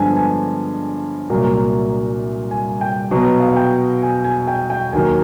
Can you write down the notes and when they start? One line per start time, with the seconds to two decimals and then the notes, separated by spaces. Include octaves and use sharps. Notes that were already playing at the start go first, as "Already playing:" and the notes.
Already playing: G2 D3 F3 G#3 B3 G#5 A5
0.16 G#5
1.30 C2 A#2 F#3 A#3
2.51 G#5
2.81 G5
3.11 B2 F#3 B3
3.40 F5
3.48 F#5
3.56 G5
4.02 G#5
4.24 G#5
4.48 G5
4.70 G5
4.92 D#2 D#3 F#3 A#3 G#5